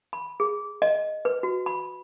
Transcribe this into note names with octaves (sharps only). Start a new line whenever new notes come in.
B5
G#4
D#5
B4
F#4
B5